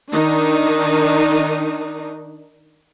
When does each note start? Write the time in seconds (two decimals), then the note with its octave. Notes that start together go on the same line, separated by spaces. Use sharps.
0.12 D#3 D4 D#4